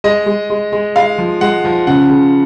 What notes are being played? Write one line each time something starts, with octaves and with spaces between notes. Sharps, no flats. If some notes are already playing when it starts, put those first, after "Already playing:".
G#3 D#5
G#3
G#3
G#3
G#3 F5
F3
G#3 F#5
F3
C#3 F#5
C#3